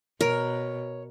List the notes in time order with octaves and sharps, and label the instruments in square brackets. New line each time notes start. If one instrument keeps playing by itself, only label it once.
[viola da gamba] B2 [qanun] A#4 [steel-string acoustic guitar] C#5